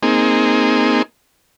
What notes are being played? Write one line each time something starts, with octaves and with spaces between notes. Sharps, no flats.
A#3 C4 D#4 G#4